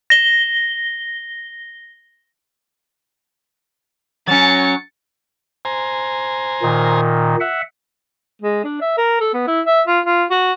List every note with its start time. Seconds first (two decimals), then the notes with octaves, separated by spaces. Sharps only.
0.10 A#6 G7
4.27 F#3 C#4 A6 C#7
5.65 C5 G#5 A#5
6.62 A#2 D#3
7.40 E5 F#5
8.42 G#3
8.64 D4
8.81 E5
8.98 A#4
9.21 A4
9.34 B3
9.48 E4
9.66 E5
9.87 F4
10.06 F4
10.30 F#4